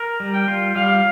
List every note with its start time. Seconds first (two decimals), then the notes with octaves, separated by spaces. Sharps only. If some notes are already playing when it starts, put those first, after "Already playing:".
Already playing: A#4
0.20 G3
0.34 G5
0.48 F4
0.75 G3 F5